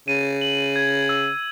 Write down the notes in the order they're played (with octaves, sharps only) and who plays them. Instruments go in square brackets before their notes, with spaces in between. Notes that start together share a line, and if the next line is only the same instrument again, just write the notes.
[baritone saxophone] C#3 [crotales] D#7
[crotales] F#7
G#6
E6